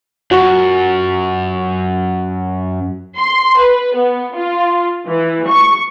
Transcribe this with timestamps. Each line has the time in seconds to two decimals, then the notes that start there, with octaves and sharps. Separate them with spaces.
0.31 F#2 F#4
3.19 C6
3.58 B4
3.95 B3
4.36 F4
5.08 E3
5.48 C#6